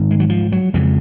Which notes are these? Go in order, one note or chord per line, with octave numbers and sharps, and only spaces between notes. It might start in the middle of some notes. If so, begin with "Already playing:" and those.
Already playing: G#2 D#3
G#3
F#3
F3
F#3
F2 C#3 G#3